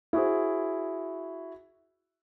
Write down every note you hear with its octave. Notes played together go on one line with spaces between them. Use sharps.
E4 F#4 G#4 C5